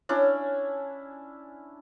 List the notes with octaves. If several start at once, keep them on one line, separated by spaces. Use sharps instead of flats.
C#4 D4 E4